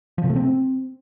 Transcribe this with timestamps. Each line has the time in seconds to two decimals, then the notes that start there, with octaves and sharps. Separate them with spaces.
0.18 F3
0.24 C3
0.30 A3
0.36 C4